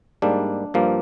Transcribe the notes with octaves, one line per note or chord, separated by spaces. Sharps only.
G#2 G3 A#3 D4
G2 F3 A#3